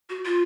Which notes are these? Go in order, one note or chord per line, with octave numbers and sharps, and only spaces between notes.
F#4
F4